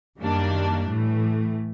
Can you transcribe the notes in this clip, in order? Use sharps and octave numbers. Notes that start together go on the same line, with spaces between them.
F#2 D#3 G3 A#3 D4
A2 E3 A3